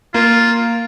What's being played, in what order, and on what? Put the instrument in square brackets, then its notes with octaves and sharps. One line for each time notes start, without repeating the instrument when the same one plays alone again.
[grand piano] A#3 [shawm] F4